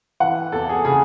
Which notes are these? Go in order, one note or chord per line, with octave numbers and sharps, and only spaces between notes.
E3 F#5
E2 A4
G#4
C#3 G#4